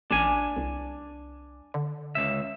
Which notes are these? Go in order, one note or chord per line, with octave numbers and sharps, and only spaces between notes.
A1 D4 G#5
C2
D3
C#2 E5